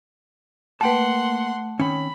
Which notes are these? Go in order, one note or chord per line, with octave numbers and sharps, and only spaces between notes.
A3 A#3 B4 F#5 G5 A5 C6
D#3 C4 C#4 C#5 B5